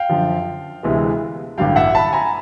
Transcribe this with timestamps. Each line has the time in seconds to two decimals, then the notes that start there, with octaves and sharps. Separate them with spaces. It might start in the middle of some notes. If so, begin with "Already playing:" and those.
Already playing: F5 G5
0.09 F#2 D3 F3
0.83 D2 C3 E3 G#3 B3
1.58 A1 G2 D3 F#3 F5 G5
1.76 E5 F#5
1.95 A5 B5
2.13 G#5 A#5